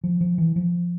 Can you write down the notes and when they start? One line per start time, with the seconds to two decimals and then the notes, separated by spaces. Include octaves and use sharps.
0.04 F3
0.21 F3
0.38 E3
0.56 F3